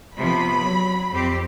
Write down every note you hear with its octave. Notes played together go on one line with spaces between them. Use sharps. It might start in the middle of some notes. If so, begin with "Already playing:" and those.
C3 F3 B3 B5
F#3
F2 C4 G4